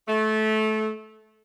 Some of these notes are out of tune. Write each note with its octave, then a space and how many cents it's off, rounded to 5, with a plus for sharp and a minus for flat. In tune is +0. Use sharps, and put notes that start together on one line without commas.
A3 -20